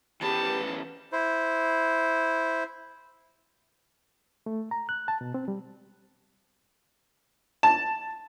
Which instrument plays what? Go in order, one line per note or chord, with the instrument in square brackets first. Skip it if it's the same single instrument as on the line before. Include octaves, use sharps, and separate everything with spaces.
[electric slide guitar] E3 B3 C#4 [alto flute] G4 [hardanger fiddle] A5
[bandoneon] E4 C5
[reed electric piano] A3
A#5
F#6
A5
B2
C4
G3
[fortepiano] A5